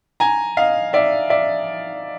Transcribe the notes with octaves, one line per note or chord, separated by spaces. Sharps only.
G#5 A#5
D#5 F5
D5 E5
D5 E5